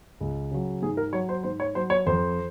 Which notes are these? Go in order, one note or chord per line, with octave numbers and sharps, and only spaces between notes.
C#2
C#3 F#3
G#2 G#4
A#4
F#3 C#5
C5
G#2 C5
C#5
F#3 C5
C#5
F2 C5